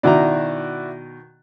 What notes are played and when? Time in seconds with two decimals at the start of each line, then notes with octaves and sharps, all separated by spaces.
0.03 B2 D#3 E4 F#4 D5 A#5